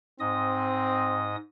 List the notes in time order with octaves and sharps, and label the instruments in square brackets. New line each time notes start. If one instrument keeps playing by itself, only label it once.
[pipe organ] G#2 D#5 D#6 [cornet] C4